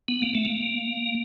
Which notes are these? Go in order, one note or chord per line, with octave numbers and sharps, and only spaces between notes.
B3
A#3
A3
A#3